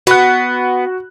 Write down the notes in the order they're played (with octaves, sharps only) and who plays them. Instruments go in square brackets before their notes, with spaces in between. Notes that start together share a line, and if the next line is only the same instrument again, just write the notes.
[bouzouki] B3 [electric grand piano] F#4 F#6